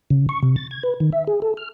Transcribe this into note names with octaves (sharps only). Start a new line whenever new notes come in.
C#3
C#6
C3
A6
G#6
B4
D#3
E5
G#4
A4
F6